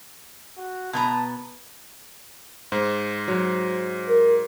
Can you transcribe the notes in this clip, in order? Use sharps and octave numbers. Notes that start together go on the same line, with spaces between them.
F#4
B2 B3 A5 A#5
G#2 C5
F#3
A#4